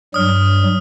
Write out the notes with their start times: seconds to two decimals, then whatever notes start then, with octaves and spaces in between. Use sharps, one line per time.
0.14 G2 F#3 G3 D#6 F6